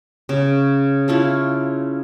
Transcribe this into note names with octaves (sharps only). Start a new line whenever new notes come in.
C#3
E4 F4 A4 C#5